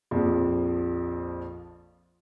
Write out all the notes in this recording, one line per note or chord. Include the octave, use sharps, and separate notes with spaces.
A#1 F2 F3